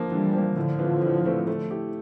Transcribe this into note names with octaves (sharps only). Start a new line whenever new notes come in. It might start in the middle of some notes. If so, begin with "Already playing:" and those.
Already playing: D3 F3 A#3
D3 E3 G3
F3
A#3
A2 D3 F3
E3 A3 C4 F4
A2
E3 A3 C4 F4
A3
E4 G4